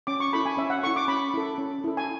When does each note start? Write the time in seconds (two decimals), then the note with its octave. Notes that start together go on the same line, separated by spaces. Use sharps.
0.07 C#4 D6
0.20 C#6
0.33 E4 A4 B5
0.46 G#5
0.58 C#4 E5
0.70 F#5
0.83 E4 A4 C#6
0.96 D6
1.08 C#4 B5
1.34 E4 A4
1.58 C#4
1.84 E4 A4
1.97 G#5